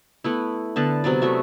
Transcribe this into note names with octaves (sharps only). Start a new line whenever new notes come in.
A3 B3 E4
D3 B3 A5
C3 F#3 B3 D5
A3 F#4 E5